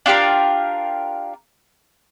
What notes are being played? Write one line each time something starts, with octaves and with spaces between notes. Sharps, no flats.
D4 F4 G4 A#4